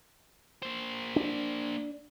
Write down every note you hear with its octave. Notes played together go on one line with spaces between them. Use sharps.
A#3 C5
D4